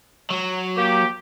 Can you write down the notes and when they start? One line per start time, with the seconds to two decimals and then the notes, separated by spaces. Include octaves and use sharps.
0.30 F#3
0.77 A#3 G4